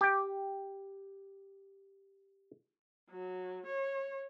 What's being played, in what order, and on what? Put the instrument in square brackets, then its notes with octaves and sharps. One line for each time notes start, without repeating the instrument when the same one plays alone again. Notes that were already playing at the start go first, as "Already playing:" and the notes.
[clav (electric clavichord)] G4 G5
[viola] F#3
C#5